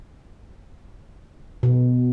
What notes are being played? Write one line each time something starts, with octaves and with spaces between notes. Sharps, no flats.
B2